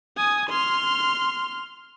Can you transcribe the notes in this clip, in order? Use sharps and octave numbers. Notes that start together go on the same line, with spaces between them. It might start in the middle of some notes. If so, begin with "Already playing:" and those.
G#5 D#6
C6 F6